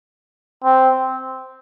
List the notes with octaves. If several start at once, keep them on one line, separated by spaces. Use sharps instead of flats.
C4